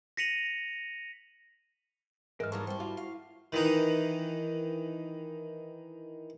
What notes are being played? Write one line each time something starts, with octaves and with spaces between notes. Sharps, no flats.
A#6 B6 C#7 D#7 F7 F#7
G#2 E3 G#3 A#4 F6
F#3 G3 A#3 D#4 A5 C6 C#6
G3 C4 E4
F4 F#4
F5
D#3 E3 D#4